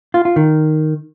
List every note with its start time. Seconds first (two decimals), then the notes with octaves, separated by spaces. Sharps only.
0.14 F4
0.25 F4
0.36 D#3